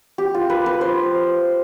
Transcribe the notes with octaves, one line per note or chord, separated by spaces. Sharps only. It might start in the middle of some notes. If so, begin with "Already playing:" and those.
G4
F4
B4
B4
C5